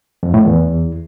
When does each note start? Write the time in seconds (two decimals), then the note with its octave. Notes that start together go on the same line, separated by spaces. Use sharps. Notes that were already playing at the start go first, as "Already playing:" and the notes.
0.23 F2
0.34 A2
0.45 E2